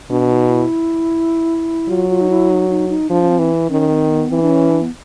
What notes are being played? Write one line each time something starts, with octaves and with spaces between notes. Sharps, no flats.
B2 D4
D#4
E4
F#3 F4
F4
D#4
E4
D#4
D#4
D#4
F3 D4
C#4
C4
E3
D#3 C#4
C4
B3
E3 C4
D4
C#4
D4
B3